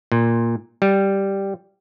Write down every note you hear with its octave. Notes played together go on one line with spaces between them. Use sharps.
A#2
G3